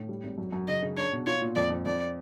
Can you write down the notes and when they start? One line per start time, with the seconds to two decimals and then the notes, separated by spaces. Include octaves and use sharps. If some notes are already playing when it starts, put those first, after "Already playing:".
Already playing: A2
0.09 G3
0.23 G#1
0.38 F#2
0.52 F#2
0.68 C#3 D#5
0.82 C#3
0.97 D4 C#5
1.12 B2
1.26 F4 C#5
1.42 A#2
1.55 F2 D5
1.70 F2
1.86 F2 D5